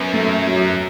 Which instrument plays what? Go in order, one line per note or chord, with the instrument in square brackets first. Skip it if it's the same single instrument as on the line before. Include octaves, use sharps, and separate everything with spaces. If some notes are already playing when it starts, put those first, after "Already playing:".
Already playing: [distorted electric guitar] F#2 [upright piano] B3
[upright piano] A3
F#3